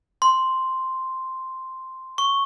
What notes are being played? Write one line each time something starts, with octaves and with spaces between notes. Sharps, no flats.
C6
C#6